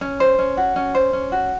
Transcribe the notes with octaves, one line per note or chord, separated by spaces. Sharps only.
C#4
C5
C#4
F#4
C#4
C5
C#4
F#4